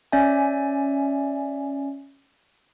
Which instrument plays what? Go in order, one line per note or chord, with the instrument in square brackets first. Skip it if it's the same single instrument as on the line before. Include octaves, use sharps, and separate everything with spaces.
[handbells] C#4 D5 E5 G#5